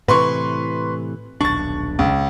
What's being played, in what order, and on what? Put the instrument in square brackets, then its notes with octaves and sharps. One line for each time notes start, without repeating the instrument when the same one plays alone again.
[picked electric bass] A2 C3 E3 [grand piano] B4 C6 C#6
[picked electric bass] D#1 B1 D4 [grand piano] C#6 A6
[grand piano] C#2